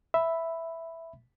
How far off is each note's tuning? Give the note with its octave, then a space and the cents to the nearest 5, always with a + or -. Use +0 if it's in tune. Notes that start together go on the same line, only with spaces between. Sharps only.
E5 +0 B5 +0